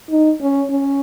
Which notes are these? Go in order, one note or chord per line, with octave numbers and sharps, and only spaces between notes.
D#4
C#4
C#4